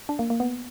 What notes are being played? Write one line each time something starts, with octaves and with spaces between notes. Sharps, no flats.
D4
A#3
A#3
B3